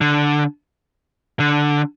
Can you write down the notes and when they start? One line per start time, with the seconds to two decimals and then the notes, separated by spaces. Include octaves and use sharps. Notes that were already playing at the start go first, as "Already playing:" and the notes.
0.01 D3
1.40 D3